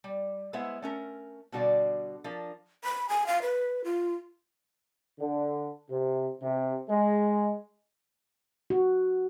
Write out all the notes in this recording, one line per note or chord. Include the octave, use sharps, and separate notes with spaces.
G3
G#3 B3 E4 C5 E5 F#5
A3 C#4 A#4
B2 D3 G3 F#4 D5 F5
F3 D4 A#4
B5
G#5
F5
B4
F4
D3
C3
C3
G#3
F#4